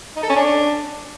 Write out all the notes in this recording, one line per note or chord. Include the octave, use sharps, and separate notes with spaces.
D#4
A4
C#4
D4